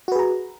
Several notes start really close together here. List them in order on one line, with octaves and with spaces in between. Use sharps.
F#4 B4 G#4 A#5